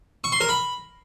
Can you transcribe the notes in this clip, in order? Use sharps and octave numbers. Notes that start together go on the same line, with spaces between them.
C#6
C6
A#4
B5